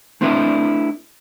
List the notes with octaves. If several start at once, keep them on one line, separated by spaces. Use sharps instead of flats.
A3 C4 D4 E4 B4 E5